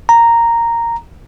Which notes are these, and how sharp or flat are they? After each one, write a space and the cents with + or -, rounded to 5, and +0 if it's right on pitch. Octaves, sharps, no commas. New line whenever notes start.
A#5 -5